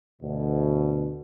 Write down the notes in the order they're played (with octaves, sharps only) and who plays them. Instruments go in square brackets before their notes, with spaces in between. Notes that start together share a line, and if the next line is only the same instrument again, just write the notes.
[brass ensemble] D2 B2